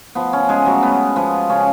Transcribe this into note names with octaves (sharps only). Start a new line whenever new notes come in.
F3 B3
C#4
G#3 A3 G#4
F#3 F#4
G#3 B3
F3 B3
C#3 C#4